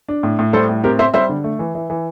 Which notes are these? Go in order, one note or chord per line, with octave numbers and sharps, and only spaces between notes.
D4
A2
A2
G3 A4 C5
A2
C4 G4 A#4
C4 C5 E5
G3 C5 E5
D3
A3
E3
E3
E3